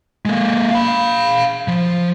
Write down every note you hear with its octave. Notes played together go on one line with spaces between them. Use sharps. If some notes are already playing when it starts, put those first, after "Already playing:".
G#3 A#3
F5 B5
F3